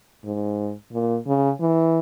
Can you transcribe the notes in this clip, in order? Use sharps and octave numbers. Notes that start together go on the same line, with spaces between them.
G#2
A#2
C#3
E3